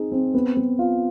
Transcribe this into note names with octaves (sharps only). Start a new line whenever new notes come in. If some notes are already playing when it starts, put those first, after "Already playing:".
Already playing: C4 D#4 G#4
C4
B3
B3
F4